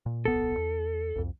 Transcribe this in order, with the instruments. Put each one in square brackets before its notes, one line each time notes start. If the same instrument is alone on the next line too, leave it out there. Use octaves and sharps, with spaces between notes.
[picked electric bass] A#2
[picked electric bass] D1 B1 B3 [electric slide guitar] A4
[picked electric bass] E2
C2 F2